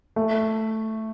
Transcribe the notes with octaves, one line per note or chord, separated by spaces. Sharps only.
A3